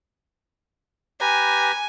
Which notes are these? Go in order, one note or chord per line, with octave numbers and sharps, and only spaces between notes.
G4 B4 G#5 A#5